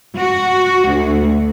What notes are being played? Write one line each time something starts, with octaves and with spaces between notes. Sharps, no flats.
F#4
D2